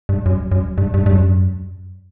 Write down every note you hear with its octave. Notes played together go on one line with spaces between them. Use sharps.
G2
F#2
F#2
G2
G2
G2
F#2